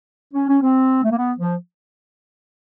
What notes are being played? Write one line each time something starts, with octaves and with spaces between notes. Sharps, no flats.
C#4
C#4
C4
A3
A#3
B3
F3